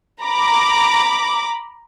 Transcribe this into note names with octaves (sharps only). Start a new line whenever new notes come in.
A#5 B5 D6